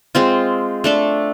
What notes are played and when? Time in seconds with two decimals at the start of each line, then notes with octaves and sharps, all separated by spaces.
0.15 G#3 C4 F4
0.84 A3 D4 A4